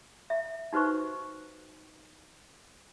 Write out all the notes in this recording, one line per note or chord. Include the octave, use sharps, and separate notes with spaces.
E5
D#4 F#4 B4 C5 C#6